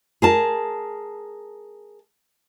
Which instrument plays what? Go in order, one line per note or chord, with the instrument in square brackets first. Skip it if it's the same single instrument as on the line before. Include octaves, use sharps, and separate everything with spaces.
[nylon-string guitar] G#4 A#4 A5